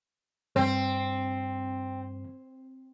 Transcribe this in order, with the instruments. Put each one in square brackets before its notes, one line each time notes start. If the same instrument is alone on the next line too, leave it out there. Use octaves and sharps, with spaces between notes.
[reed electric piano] G2 [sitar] C4